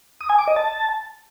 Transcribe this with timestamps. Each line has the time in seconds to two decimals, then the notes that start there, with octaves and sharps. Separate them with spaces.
0.21 D#6
0.29 G#5
0.38 D6
0.47 D#5
0.56 A5